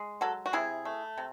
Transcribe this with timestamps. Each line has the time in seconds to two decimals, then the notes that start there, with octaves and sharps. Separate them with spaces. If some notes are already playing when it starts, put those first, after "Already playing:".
Already playing: G#3
0.21 F#3 F#4 A4
0.46 F#4
0.53 C3 E4 G#4
0.85 A3
1.18 C3